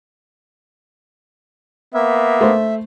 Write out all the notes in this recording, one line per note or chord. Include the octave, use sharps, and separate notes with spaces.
A#3 B3 E5
A3 C5